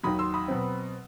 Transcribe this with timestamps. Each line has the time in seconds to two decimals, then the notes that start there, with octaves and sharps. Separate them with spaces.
0.03 D#2 D#3 F#3 B5 D#6
0.19 C6 E6
0.34 B5 D#6
0.48 B2 F#3 C4